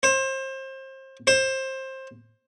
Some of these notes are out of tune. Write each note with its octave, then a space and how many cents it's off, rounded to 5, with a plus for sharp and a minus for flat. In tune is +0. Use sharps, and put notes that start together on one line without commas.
C5 +30
C5 +20